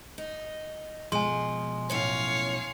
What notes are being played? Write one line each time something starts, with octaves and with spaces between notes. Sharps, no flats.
D#4
B2 F3 G#3 G#5 C6
F#2 A2 C#4 C#5 F5